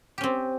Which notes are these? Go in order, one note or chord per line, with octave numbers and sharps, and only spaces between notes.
C4 C#4 G4